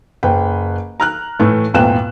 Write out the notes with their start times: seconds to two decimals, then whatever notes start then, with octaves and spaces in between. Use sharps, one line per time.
0.23 F#1 B4 G5
1.00 A#5 F6 F#6
1.40 A2 E3 A3
1.74 G#1 E2 A#2 G5 F#6 E7